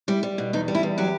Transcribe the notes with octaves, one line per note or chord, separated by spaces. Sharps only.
G3 E4
G3
B2
E2 D#4
G3
E4
E2
F#3 G4